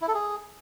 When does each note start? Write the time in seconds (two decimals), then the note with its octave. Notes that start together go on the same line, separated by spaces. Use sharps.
0.02 E4
0.08 A4
0.14 G#4